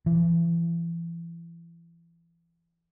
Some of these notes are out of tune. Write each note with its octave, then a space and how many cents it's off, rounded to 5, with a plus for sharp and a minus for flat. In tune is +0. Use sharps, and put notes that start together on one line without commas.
E3 +30